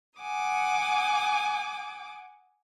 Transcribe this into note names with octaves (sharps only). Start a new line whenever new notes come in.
F#5 G#5 D6 D#6